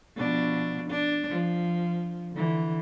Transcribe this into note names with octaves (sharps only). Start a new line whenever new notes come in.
B2 F3 D4
D4
F3
D3 E3